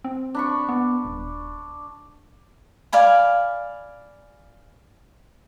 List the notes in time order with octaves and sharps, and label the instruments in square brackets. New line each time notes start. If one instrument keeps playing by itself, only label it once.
[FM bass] C4
[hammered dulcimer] D4 B5 C#6
[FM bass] B3
D#1
[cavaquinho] D5 F5 G#5 B5